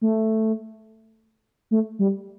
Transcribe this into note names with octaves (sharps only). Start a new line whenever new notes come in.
A3
A3
G3